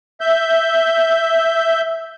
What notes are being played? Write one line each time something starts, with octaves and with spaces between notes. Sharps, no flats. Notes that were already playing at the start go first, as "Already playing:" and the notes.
E5 G6